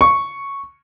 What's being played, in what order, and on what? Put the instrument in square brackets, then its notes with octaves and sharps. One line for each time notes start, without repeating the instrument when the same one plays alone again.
[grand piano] C#6